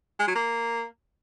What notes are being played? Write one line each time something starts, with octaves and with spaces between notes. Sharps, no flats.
G#3
F#3
A#3